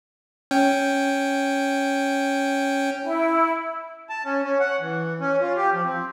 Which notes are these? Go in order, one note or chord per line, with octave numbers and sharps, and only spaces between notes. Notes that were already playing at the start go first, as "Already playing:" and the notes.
C#4 G5
E4
A5
C#4
C#4
F#5
E3
C#4
F4
G4
F3
C4